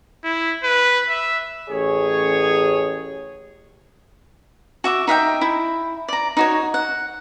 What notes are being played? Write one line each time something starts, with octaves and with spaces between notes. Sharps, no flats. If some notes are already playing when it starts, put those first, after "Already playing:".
E4
B4
E5
A1 G#4 C#5
F#4 E5 D6
D#4 E5 F#5 G5
E4
D5 A#5
D#4 F#4 C#5
F#5